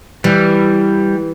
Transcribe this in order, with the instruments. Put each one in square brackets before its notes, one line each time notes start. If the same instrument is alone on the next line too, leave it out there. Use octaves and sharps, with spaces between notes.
[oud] E3 [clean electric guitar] G3